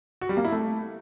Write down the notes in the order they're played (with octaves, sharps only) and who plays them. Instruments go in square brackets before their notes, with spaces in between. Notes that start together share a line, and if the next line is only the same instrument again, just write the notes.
[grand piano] F#4
G3
A#3
E4
A3